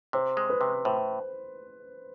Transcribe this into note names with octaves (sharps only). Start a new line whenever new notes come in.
C3 C5
G#3
B4
C3
A2 C5